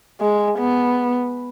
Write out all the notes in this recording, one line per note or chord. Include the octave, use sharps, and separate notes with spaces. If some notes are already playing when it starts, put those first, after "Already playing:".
G#3
B3